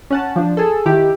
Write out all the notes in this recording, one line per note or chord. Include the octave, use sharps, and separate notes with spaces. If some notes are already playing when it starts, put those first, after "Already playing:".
C#4 F#5 A5
F3 D4
G#4 A4
D#3 E4 G4